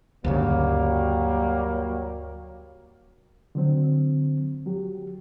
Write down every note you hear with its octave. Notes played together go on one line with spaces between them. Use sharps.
D2 G2 C#3 F#3 G3 A#3
D3 F#3 C4
F#3 G4